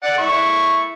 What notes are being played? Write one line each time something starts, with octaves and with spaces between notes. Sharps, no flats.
D5 F#5
E4 C#6